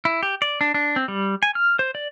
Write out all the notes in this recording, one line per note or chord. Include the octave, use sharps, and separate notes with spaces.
E4
G4
D5
D4
D4
C4
G3
G#5
F6
C5
D5